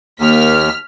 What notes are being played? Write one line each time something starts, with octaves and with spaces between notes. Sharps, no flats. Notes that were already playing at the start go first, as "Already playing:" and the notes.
D#2 A#3 F6 B6